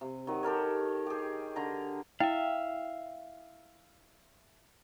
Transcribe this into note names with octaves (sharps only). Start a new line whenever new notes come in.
C3
D#3 F#3
G4 A4 A#4 C#5
G4 G#4
D3 A#5
E4 E5 F5 G5